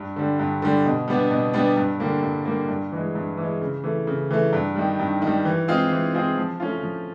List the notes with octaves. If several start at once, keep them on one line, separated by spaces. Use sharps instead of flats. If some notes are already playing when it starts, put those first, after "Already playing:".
Already playing: G2
D3 G3
G2
D3 G3
B2
G3 B3 D4
B2
G3 B3 D4
G2
D3 G3 A#3
G2
D3 G3 A#3
G2
E3 G#3
G2
E3
G#3
C#3
E3 A3
C#3
E3 A3
G2
D#3 G3
G2
D#3 G3
E3
G#3 C4 F4 G#4
E3
G#3 C4 F4 G#4
F3
A3 C#4 F4
F3